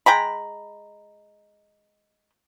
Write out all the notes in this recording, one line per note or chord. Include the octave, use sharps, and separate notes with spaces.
G#3 G5 A#5 B5